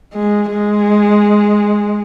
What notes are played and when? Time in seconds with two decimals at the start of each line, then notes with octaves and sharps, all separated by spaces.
0.13 G#3
0.50 G#3